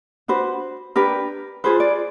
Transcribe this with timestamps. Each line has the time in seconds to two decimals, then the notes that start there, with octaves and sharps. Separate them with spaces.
0.28 D4 F#4 B4 C5
0.96 D4 G4 A#4 B4
1.64 F4 G#4 B4 C5
1.80 D5